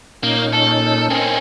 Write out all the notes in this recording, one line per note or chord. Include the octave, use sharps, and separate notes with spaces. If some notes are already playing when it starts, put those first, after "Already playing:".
A#2 A#3 C#4 D#4
A4
C4 C#4 A#4 D#5